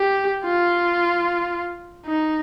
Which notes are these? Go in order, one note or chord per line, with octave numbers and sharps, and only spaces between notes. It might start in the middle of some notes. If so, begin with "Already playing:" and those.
Already playing: G4
F4
D#4